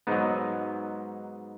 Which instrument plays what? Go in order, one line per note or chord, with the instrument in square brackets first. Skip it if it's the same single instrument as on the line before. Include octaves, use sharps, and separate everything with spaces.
[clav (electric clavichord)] G#2 F#3 B3 D#4